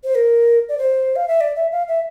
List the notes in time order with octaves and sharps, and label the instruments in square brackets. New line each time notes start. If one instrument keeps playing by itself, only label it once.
[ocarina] C5
A#4
D5
C5
F5
E5
D5
E5
F5
E5